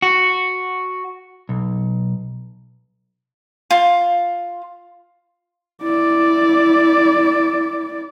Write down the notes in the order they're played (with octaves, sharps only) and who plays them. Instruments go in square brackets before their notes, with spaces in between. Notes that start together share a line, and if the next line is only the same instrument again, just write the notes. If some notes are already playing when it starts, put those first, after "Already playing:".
[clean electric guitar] F#4
B1
[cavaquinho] F4
[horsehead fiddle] E4 D5